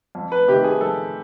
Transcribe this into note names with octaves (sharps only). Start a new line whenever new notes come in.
F2
B4
C3 D#3 G4
G#4
F2 A4